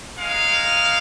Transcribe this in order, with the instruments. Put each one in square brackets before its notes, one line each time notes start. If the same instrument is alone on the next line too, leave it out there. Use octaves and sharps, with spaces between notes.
[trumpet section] G#3 D#4 F5